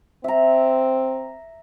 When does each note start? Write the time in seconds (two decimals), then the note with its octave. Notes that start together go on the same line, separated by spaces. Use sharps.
0.24 C4 E5 A#5